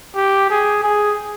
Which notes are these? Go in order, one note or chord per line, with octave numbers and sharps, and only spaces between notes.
G4
G#4
G#4